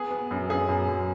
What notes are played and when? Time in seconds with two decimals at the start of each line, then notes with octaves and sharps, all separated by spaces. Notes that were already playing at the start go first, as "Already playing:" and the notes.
Already playing: B3 G#4
0.11 B3
0.31 F#2
0.50 F#2 G#4
0.69 F#2
0.88 F#2